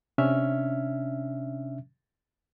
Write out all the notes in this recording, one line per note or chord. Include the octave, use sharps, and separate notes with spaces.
C3 C#4 D4 E5 F6